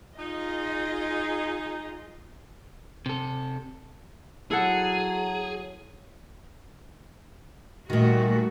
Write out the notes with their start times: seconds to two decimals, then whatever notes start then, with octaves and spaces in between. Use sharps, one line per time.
0.19 D#4 F4 G#4 D#5
3.06 C3 A4
4.51 F#3 E4 G#4 A4 F#5
7.90 A#2 D#3 G3 A3 F#4